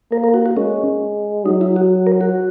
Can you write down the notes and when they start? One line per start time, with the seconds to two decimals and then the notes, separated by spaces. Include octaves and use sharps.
0.12 A#3 A#4
0.24 A#4
0.34 F#4
0.46 F#4
0.57 G#3 C#4
1.46 F#3 D#4
1.61 E4
1.76 F#4
2.07 A#4
2.21 F#4